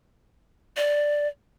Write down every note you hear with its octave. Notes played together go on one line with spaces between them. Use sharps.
D5